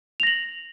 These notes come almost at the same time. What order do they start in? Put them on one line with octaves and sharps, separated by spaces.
F7 A#6 F#7